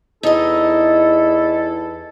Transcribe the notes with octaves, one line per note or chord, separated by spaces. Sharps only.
E2 D#4 E4 A4 D#5